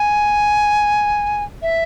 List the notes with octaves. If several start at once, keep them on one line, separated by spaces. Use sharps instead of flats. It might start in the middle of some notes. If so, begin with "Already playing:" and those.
Already playing: G#5
E5